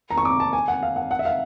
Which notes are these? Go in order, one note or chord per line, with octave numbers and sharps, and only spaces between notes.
A#5
C#6
D6
A5
G#5
F#5
F5
F#5
F#5
E5
F5